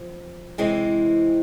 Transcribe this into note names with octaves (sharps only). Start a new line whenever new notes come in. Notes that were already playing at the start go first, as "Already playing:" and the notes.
Already playing: F3 C4
C3 E3 G#3 C4 E4